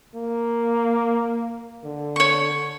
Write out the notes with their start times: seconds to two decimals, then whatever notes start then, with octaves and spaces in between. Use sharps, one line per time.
0.15 A#3
1.84 D3
2.16 C#5 C#6